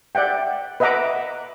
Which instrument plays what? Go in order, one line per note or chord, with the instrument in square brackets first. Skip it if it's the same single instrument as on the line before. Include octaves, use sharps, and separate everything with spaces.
[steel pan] D5 E5 F#5 G5
B4 D#5 E5 F#5 A#5 D6